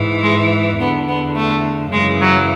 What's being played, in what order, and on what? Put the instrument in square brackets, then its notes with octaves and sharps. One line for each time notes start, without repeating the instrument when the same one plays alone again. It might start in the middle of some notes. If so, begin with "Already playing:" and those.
Already playing: [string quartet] G#2 E3
G#3
E2 B3
D3
B3
A3
F#2 C#3 E3 G#3
F#3